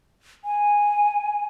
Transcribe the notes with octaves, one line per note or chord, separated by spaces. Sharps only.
G#5